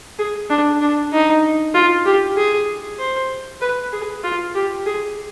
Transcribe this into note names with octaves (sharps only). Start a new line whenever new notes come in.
G#4
D4
D4
D#4
F4
G4
G#4
C5
B4
G#4
F4
G4
G#4